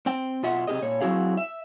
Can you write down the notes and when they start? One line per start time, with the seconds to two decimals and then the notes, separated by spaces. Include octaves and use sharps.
0.06 C4 G5
0.43 B2 F4 E5 F#5
0.67 C3 F3 G4 G#4 D#5
0.82 A#2 C#5
1.01 F#3 C4 E4 F#4 G#4 F5
1.37 E5